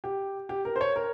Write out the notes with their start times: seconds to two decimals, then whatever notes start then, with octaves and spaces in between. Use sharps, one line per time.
0.04 G4
0.49 G4
0.65 A#4
0.76 C5
0.81 C#5
0.96 A#4